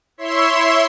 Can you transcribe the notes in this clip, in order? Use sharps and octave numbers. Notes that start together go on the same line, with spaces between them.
E4 C#5 E5 C6